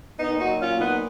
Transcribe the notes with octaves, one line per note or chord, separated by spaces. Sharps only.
A#2 B3 D#4
D#4 F#4
F#3
C#4 F4
A#2
B3 D#4